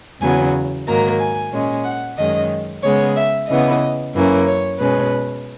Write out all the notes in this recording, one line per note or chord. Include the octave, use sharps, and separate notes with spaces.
E2 C#3 F#3 B3 G#5
G#2 D#3 F#3 A#3 A#5
G#5
A#2 G#3 C#4
F#5
F#2 D#3 G#3 C#4 D#5
C#3 G#3 B3 C#5
E5
C#3 E3 B3 D#5
F#2 E3 A#3 C#4
C#5
B2 G#3 C#4 B4